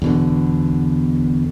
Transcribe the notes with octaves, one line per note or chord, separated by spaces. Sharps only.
E2 B2 D3